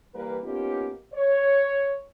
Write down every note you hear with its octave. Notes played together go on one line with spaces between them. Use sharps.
E3 G3 A#3 A#4 B4
A#3 B3 C#4 D#4 F4 G4
C#5